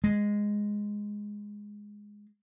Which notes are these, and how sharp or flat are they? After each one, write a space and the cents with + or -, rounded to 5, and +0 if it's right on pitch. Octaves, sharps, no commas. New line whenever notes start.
G#3 -5